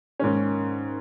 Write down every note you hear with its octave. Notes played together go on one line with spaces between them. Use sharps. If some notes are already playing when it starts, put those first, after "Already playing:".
G#2 D#3 A#3 C#4